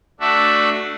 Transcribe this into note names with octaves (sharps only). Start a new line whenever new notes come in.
A3 D4 F#4 E5